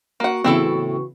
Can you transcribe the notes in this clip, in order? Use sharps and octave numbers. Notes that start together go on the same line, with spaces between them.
A#3 F#4 F#5
A2 C#3 E3 B3 C4 E4 A4